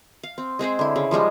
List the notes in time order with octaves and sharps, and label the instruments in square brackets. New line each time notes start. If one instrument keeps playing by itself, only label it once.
[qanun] F5
C4
G#3 C4 G#4 C5
D3 E4
C#3
F3 G3 G#3 D#4